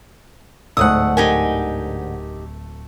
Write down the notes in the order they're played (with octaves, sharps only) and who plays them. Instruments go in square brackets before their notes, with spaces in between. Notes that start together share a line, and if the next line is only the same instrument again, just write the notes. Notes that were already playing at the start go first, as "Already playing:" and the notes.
[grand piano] D1 A3 [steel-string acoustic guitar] D2 G#2 F#5 [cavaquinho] D#6 [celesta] E6 F#6
[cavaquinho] D#4 G4 G#5 [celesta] A#4